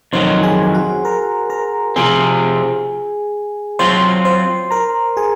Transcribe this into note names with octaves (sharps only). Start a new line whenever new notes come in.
F2 D#3 F#3 C5 C6
G#4 G#5
G#5
F#4 F#5
A#4 A#5
A#4 A#5
C3 F3 C4 G#4 G#5
F#3 C4 F4 C5 C6
C5 C6
A#4 A#5
G#4 G#5